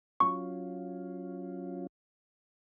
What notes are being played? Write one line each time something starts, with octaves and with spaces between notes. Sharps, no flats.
F#3 C#4 F4 C#6